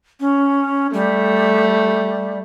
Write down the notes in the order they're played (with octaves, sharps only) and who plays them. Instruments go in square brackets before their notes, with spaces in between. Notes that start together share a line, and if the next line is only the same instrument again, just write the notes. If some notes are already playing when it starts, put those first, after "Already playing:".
[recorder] C#4
[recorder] G3 [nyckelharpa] A3